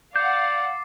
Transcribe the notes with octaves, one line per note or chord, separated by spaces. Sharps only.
D5 F5 F#5 D6 G6 A6 C7